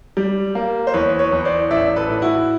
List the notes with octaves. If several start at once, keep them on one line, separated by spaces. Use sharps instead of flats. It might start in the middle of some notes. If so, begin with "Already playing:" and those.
G3
A#3
C5
E2 B4 C#5
B4 C#5
E2
C5 D5
A1 D5 E5
A4 B4
A2
E4 F#4